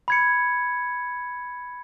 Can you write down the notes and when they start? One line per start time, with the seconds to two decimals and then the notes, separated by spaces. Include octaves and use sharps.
0.08 B5 G#6 C#7